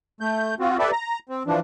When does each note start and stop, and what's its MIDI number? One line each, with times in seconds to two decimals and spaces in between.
0.21 0.55 57
0.21 0.55 91
0.60 0.77 60
0.60 0.77 65
0.60 0.77 66
0.79 0.91 67
0.79 0.91 69
0.79 0.91 71
0.79 0.91 74
0.79 0.91 76
0.92 1.19 82
1.29 1.43 60
1.47 1.60 52
1.47 1.60 53
1.47 1.60 62